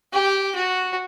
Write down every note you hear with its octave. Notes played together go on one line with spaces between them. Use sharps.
G4
F#4